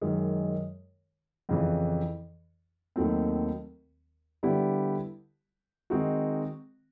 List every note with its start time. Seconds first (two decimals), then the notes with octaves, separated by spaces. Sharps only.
0.01 F#2 D#3 G#3
1.49 F2 C#3 E3
2.96 D#2 D#3 F#3 A3 C4
4.43 D3 G3 B3 E4 G4
5.90 D#3 G#3 C4 D#4 F#4